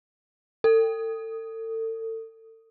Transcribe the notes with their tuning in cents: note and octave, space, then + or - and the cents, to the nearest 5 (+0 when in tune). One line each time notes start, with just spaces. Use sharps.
A4 +35